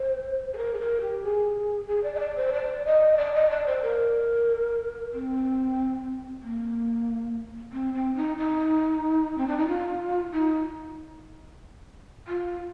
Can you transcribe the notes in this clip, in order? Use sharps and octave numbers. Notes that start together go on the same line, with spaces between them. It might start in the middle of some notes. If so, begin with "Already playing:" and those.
Already playing: C5
G#4
A#4
G#4
A#4
G4
G#4
G#4
D5
D#5
D5
C5
D5
D#5
D5
D#5
D5
C5
A#4
C4
A#3
C4
C4
D#4
D#4
C4
D4
D#4
F4
D#4
F4